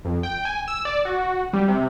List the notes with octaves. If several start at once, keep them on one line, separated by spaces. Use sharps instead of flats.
F2
G5
G#5
E6
D5
F#4
G3
C3